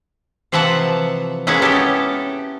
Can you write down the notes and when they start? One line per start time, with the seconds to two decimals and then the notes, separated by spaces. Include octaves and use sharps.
0.52 C3 E3 F3 E5 F#5 A5
1.47 G#3 A#3 B3 C#4 E4
1.62 C#4 G4 A4